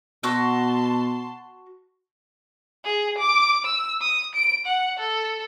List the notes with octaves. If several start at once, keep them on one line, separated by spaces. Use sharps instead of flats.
B2 F#4 A5 C6 E6
G#4
D6
E6
D#6
D7
F#5
A4